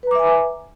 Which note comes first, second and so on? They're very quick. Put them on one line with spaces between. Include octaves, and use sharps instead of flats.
B4 A#5 D6 E5 G#5